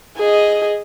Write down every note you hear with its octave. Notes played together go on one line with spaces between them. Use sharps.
G#4 D#5